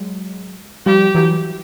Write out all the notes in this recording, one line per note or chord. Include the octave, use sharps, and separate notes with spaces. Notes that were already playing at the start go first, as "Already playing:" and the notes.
Already playing: F#3 G#3
F3 G3 G4
E3 F#3